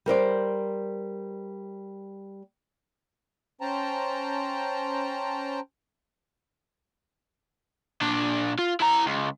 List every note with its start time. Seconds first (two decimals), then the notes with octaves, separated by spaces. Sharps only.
0.06 G3 A#4 C5 D5
3.61 C#4 C5 G5 A5 A#5
8.01 A#2 D4
8.59 F4
8.80 E4 A#5
9.06 C#2